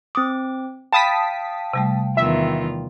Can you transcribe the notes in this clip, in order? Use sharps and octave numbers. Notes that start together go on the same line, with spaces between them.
C4 D6 D#6
F5 G5 A5 B5 D#6 B6
C3 G3 A3
E2 D#3 F4 E5